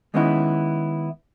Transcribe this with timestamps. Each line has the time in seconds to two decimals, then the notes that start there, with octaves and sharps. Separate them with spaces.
0.14 D#3 G#3 B3 C#4 D#4 E4